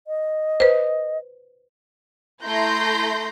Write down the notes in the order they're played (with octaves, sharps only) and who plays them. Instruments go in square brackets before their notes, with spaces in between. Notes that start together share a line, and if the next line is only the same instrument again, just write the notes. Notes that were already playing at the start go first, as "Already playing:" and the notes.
[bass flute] D#5
[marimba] B4 C5
[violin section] A3 E4 A#5 C6 G6 A#6